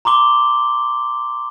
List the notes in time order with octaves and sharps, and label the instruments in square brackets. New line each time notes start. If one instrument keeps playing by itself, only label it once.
[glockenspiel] A#5 C6 D6 G7